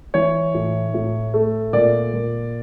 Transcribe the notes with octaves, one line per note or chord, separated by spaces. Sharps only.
E3 C#5
A2
A2
A3
A#2 D5
A#2